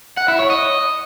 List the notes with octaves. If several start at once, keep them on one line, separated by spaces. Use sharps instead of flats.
F#5
E4
C#5
D#5